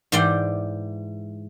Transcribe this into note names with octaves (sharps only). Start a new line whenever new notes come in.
G#2 E3 C5 D5 G5 C6